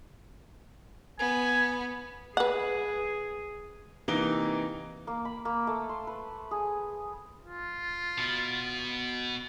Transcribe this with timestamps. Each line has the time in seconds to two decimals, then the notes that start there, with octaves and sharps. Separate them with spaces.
1.20 B3 G#5
2.37 G#4 B4 F#5
4.08 C3 E3 A#3 D#4 A#4 G7
5.07 A#3
5.25 B5
5.45 A#3
5.67 A3
5.89 C6
6.07 B4
6.51 G#4
7.44 F4
8.18 B2 B3